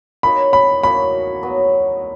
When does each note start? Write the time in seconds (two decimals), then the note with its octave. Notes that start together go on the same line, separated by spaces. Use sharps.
0.23 A#3 D#4 F#4 C#5 B5
0.53 B5
0.83 A#3 D#4 F#4 C#5 B5
1.43 F#3 B3 F#4 B4